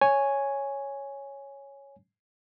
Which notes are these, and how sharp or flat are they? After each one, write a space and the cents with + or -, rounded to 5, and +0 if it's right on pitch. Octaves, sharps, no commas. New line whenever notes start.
C#5 +0 G#5 +0